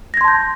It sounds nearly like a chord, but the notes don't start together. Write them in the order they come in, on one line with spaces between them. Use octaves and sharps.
A#6 G#6 C6 A5 G6